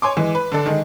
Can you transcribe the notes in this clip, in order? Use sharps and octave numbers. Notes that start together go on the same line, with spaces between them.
C#5 G#5 C6 D6
E3 G#3
B4
D3 D4 A4
D#3 G#3